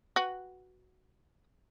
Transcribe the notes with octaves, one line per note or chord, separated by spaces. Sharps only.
F#4 B4